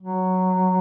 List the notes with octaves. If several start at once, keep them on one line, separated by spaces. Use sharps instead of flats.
F#3